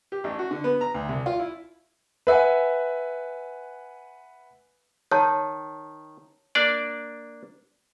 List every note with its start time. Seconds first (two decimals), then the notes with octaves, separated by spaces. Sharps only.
0.12 G4
0.24 A1
0.39 F#4
0.51 D3
0.64 B3
0.81 A#5
0.94 D2
1.09 C2
1.26 F4
1.40 E4
2.27 B4 E5 F#5 G#5
5.11 D#3 C#5 A5
6.55 A#3 D4 D5